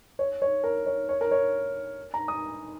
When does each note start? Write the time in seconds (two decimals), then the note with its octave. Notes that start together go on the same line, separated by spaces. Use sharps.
0.19 C#5
0.42 C#5
0.64 A#4
0.86 C#5
1.09 C#5
1.21 A#4
1.31 C#5
2.14 A#5
2.28 D#6